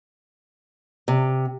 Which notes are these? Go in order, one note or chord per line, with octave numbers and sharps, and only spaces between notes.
C3